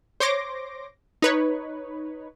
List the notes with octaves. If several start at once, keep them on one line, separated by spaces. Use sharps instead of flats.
C5 C#5 C6 D6 A#6
D#4 B4 C#5